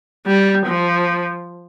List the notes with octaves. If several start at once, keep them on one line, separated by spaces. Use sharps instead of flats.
G3
F3